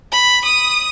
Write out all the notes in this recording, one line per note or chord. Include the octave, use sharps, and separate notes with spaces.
B5
D#6